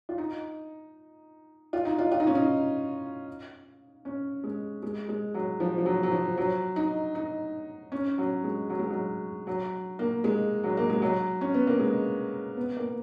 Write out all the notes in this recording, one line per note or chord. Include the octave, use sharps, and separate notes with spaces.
F4
D#4
F4
D#4
F4
F4
D#4
C#4
D#4
C#4
G#3
G#3
G#3
F#3
F3
F3
F#3
F#3
F3
F#3
D#4
D#4
C#4
F#3
G#3
F#3
G#3
F#3
F#3
A#3
G#3
F#3
A#3
G#3
F#3
C#4
B3
A#3
G#3
B3
A#3